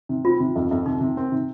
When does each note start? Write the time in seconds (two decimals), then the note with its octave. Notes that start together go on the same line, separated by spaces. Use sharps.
0.09 C3
0.25 C4 F4
0.40 C3
0.56 F2
0.71 F2
0.86 C3 D#4
1.01 C3
1.17 C4
1.32 C3